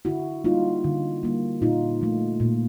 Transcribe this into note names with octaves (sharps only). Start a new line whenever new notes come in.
D3 E4 F#4
G3 A#3 D#4 F4
D3
G3 A#3
A#2 D#4 F4
F3 A3
A#2